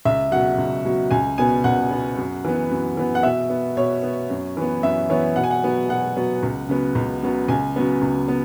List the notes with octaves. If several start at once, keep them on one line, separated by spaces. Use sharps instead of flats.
C#2 E5
B2 F#3 F#5
C#2
B2 F#3
C#2 G#5
B2 B3 G#5
C#2 F#5
B2 B3
F#2
E3 B3
F#2
E3 B3
F#5
B2 E5
B3
B2 C#5
B3
F#2
E3 B3
F#2 E5
E3 B3 C#5
B2 F#5
G#5
F#5
F#3 B3
B2 F#5
F#3 B3
C#2
C#3 F#3 B3
C#2
C#3 F#3 B3
C#2 G#5
C#3 F#3 B3
C#2
B3